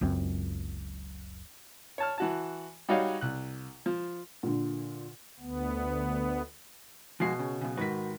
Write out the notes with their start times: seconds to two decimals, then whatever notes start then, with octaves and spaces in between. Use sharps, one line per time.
0.01 F#1 C#2 F#2 C4
1.98 C#5 A5 F6
2.18 E3 F#4 A5
2.89 G3 D#4 F#4 C#5 D#5 F5
3.21 C2 F#6
3.86 F3
4.43 A#2 D3
5.40 D2 B3
7.20 B2 F3 G#3 F#4 C7
7.39 C#3
7.61 B1 C#3
7.77 G#2 D#3 F#4 B4 B6